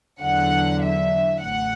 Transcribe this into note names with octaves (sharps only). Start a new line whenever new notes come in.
E2 D3 F#3 F#5
E5
A1 A2 F#5